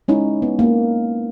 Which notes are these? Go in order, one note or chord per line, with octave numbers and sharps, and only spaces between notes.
G#3 C#4 D#4 E4
B3
A#3